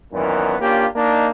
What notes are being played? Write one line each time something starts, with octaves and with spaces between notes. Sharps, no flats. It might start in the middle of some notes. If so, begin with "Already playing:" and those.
F#2 A#2 D#3 E3 B3
A#3 C#4 D4 F4 G4
A#3 D4 D#4